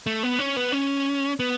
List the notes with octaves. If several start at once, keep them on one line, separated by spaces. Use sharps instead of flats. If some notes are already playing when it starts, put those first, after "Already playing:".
A3
B3
C#4
B3
C#4
B3